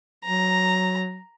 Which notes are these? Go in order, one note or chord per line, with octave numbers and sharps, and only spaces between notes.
F#3 A#5